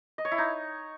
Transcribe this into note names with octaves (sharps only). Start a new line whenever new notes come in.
D#5
C#5
E4
D#4